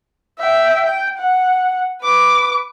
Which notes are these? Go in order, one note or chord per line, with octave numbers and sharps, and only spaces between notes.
E5 G5
G5
F#5
B4 D6